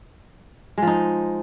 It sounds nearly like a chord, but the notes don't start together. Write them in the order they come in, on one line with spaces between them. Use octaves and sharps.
G#3 F3 D#4